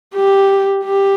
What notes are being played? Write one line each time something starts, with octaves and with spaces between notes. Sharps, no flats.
G4
G4